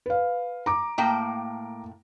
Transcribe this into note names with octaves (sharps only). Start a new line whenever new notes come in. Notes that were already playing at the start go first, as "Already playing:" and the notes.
B4 F5
A#5 D6
A2 A#3 G5